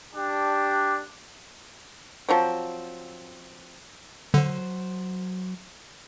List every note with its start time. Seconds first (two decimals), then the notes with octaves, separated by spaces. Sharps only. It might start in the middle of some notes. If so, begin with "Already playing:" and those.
0.14 D4 G4
2.29 F3 F#3 C4
4.34 D3 F#3 C5